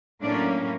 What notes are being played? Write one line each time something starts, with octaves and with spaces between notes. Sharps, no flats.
A2 F#3 A#3 C#4 D4 D5